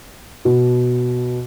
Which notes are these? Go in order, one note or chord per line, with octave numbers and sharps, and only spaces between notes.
B2